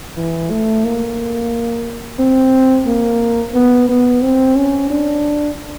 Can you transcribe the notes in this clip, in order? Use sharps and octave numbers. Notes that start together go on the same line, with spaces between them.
E3
A3
A#3
C4
A#3
B3
B3
C4
C#4
D4